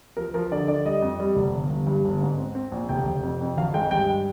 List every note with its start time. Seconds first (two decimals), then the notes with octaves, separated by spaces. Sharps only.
0.17 F3 A#4
0.34 F3 A#4
0.52 D3 D5
0.68 D3 D5
0.85 G3 D#5
1.02 F2
1.20 G3
1.36 F1
1.53 G1
1.70 G1
1.87 G2
2.04 G1
2.22 G#2
2.38 C4
2.55 C4
2.72 A#1
2.89 F1 G5
3.06 F1
3.23 F2
3.41 F2
3.57 G#1 F5
3.74 G#3 G5
3.91 G2 G5